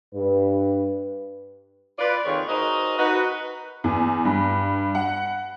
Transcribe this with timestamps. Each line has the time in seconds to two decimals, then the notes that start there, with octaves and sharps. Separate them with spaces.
0.15 G2 B4
1.99 F4 B4 D5
2.25 F2 A#2 D#3 F4 G#4 C#5
2.48 D#4 F#4 G#4 A#4 C5 D#5
2.98 D#4 F#4 B4
3.84 E2
4.25 G2
4.95 F#5